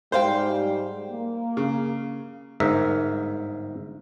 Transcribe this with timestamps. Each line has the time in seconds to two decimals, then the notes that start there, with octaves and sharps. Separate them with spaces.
0.12 G#2 G3 C5 F5 G5
1.11 A#3
1.57 C#3
2.60 G1 G#2 A#4 E5